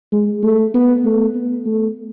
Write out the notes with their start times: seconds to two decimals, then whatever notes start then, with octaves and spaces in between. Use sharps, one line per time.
0.12 G#3
0.43 A3
0.74 B3
1.05 A3
1.35 B3
1.66 A3